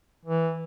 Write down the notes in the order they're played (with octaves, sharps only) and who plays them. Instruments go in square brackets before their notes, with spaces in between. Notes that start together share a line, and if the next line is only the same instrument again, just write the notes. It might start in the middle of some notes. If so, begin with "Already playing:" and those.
[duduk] E3